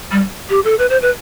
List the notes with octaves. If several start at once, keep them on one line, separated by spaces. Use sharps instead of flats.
G3
G4
A4
B4
C5
B4